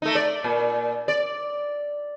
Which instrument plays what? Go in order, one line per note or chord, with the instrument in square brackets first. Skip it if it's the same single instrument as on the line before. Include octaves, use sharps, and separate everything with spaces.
[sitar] A3 D#4
D5
A#2
D5